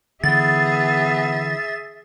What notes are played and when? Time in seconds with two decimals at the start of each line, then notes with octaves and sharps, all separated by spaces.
0.24 D3 E3 B3 G#4 E5 A6